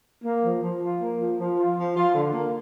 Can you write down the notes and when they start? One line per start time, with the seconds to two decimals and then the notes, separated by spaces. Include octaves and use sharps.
0.24 A#3
0.43 F3
0.62 F3
0.82 F4
1.00 A#3
1.20 F3
1.39 F3
1.58 F4
1.77 F3
1.96 F4
2.15 D3
2.33 A#3